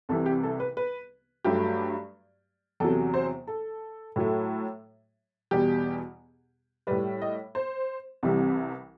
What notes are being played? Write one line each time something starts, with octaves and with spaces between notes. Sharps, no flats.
C2 C3 E3 A4
G4
A4
B4
B4
G2 F#3 A3 G4
E2 C3 F#3 A4
C5
A4
A2 F#3 A3
E2 B2 G3 G4
A2 G3 B4
D#5
C5
C2 C3 E3 G3